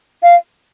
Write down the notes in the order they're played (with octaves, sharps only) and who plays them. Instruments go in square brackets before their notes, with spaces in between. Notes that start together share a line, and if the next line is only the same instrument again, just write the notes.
[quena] F5